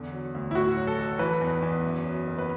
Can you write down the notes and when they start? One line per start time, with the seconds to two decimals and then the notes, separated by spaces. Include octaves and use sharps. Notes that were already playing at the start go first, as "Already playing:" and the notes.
Already playing: E2 D3
0.12 F#3
0.35 D2
0.51 E4
0.55 A2 F#4
0.77 F#3
0.87 A4
0.98 A1
1.19 E3 B4
1.41 E2
1.62 E2
1.83 F#2
2.05 F#3
2.26 F#1
2.38 B4